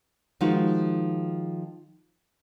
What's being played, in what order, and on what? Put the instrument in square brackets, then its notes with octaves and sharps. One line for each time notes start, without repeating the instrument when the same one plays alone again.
[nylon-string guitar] D#3 F3 G#3 D#4 F4 F#4